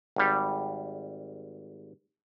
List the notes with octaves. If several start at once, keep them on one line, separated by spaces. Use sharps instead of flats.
G#1 G3